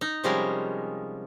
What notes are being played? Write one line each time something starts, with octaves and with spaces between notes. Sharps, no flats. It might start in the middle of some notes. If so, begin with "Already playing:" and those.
D#4
C3 F3 G3 G#3 C#4 A#4